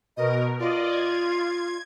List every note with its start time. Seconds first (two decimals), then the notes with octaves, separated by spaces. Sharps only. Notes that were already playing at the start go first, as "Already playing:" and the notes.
0.17 B2 A#4 D#5
0.59 F4 D5 D#5
0.91 G#6